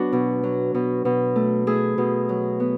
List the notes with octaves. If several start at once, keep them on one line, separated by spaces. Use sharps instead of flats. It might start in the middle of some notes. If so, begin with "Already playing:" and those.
Already playing: F#3 B3 D4 F#4
B2
F#3
B2
B2
A3
A3 E4 G#4
B2
F#3
B3